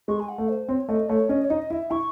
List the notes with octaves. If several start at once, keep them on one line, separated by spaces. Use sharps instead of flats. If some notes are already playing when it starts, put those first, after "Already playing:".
G#3 C#6
G#5
F#5
A3
C5
C4 C#5
A3 D#5
A3 C#5
C#4 D#5
C#5
D#4 D#5
E4 E5
E4 C#6